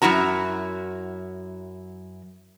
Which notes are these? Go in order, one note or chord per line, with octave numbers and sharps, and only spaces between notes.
F#2 D#3 E4 F#4 A#5